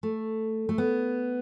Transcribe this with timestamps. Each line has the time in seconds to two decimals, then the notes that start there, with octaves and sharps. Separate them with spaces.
0.03 A3
0.69 A3
0.78 B3